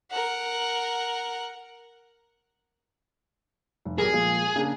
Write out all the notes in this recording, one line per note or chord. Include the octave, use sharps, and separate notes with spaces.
A#4 F#5
F1
B1 G4 G#4 A#4
A#2 F3 G#3
C#3 A#3 D4